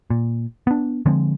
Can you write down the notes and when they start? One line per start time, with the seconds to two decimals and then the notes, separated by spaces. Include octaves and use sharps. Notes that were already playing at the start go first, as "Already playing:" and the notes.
0.10 A#2
0.67 B3 D4
1.06 D3 F3 G#3 C4